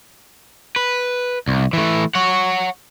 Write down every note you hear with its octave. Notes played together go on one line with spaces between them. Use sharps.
B4
C2
E3 A3
C#5 F#5